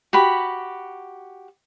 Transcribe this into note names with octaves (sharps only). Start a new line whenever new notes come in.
F#4 G4 B5